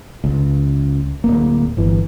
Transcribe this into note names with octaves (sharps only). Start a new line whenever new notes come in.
C#2
D1 G1 A#3
G1 E3